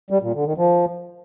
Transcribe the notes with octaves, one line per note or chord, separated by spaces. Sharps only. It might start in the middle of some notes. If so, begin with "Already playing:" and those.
G3
A#2
D3
D#3
F3